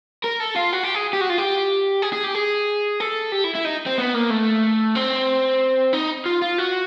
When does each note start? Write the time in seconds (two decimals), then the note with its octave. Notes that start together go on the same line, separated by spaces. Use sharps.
0.24 A#4
0.40 A4
0.56 F4
0.73 F#4
0.84 G4
0.95 G#4
1.13 G4
1.21 F#4
1.30 F4
1.38 G4
2.02 G#4
2.13 G#4
2.24 G4
2.35 G#4
3.00 A4
3.32 G4
3.44 E4
3.55 E4
3.65 D#4
3.86 C4
3.98 B3
4.14 A#3
4.30 A3
4.95 C4
5.93 D#4
6.26 F4
6.42 F4
6.58 F#4